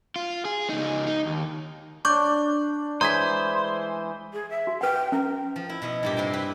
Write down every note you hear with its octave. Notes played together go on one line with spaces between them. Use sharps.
F4
G#4
C#2 D#4
D#4
D#2
D4 C#6 D6 G6
E3 G#3 G#4 C5 A#5 G#6 B6
G#4
E5
F#4
B4 F#5 G5
C#4 A#4
F3
E4
B2 E4 D#5
G2 A#2 G4
C3 A#3 C5 G5
E4 G4 B4